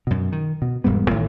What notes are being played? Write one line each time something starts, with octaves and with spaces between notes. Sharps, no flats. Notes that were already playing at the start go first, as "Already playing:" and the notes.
F#2 B2
D#3
B2
E1 G#2 G3 B3
A1 A2 D#3